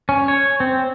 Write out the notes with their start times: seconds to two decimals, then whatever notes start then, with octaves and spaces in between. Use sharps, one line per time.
0.09 C#4
0.28 C#5
0.60 C4